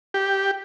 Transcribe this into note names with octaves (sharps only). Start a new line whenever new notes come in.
G4